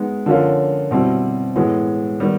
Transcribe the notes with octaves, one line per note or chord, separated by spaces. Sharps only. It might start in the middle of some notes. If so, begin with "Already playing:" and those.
Already playing: G#3 B3 D#4
D3 F3 A#3 C#4 F4
B2 G3 C4 E4
A2 E3 G#3 B3
D#3 G3 B3